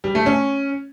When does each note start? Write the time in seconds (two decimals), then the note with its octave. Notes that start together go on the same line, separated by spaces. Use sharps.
0.04 G3
0.15 A3
0.26 C#4